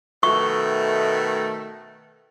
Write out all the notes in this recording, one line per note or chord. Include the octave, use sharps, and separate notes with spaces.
B2 D#3 A3 C#6